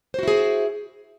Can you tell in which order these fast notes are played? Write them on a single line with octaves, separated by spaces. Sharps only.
C5 F#4 E4 G#4